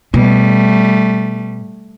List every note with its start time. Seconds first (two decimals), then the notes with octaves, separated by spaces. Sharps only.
0.14 B2 G3 A3